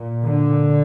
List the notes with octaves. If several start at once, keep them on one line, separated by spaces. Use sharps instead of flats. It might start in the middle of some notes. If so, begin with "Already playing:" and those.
Already playing: A#2
D3